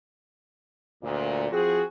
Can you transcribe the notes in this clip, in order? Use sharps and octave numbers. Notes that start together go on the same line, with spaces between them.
D2 A#2
F3 C4 F#4 G#4